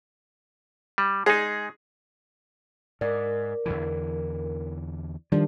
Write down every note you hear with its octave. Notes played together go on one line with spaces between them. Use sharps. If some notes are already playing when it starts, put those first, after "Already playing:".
G3
G#3 D#4 G#4
G#2 A#4 D5
E2 D3 E3
D#3 F3 G3 D4